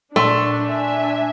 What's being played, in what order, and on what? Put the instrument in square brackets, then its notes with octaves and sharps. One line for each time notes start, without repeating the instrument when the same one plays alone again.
[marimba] A#2 C6 [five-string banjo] A3 [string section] D4
[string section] D4 E5 G#5